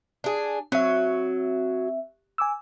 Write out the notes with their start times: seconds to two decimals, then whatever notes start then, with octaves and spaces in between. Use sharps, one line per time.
0.24 D4 G#4
0.72 F#3 C4 E5
2.38 G#5 D6 E6